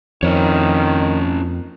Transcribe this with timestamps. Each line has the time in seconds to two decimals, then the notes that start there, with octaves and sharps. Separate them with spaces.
0.23 F2 D#3 C#4 E4 C#5